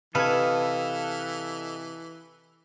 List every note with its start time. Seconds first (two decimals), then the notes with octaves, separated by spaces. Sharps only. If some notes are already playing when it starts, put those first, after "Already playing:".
0.15 C3 E3 A4 B4 D#5 F5 A5 G#6